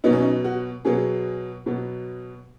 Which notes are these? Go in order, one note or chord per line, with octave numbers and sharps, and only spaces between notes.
B2 F#3 B3 D#4
C#4
D#4
F#4
B2 F#3 B3 G#4
B2 F#3 B3